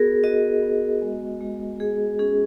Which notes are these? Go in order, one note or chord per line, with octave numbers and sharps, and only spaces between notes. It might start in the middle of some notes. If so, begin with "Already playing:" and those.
Already playing: B3 F#4 G#4 A#4
F#4 D#5
B3
G#3
G#3
G#3 G#4
C#4 G#4